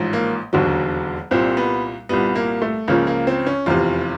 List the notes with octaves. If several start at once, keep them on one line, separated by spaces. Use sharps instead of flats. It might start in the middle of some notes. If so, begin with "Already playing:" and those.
Already playing: A1 G#2 F3
A#3
E1 D#2 D3 F#3
C2 A#2 G3 C4
B3
C2 A#2 G3 B3
A#3
A3
C#2 C#3 F3 A#3
A#3
C4
C#4
F1 E2 C3 F4